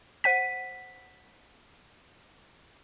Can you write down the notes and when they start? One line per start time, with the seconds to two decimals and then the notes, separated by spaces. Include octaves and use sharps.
0.24 C5 F#5 B6 D#7